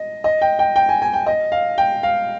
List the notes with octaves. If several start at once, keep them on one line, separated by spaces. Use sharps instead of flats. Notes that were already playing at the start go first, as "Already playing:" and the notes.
Already playing: D#5
D#5
G5
G5
G5
G#5
G#5
G5
D#5
F5
G5
F5